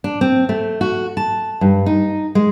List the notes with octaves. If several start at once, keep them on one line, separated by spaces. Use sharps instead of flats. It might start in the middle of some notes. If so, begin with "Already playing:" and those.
D4
C4
A3
F#4
A5
G2
D#4
G#3